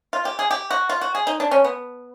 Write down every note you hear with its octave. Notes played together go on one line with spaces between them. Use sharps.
F4
G4
G#4
G4
F#4
F4
F#4
G#4
D#4
D4
C#4
B3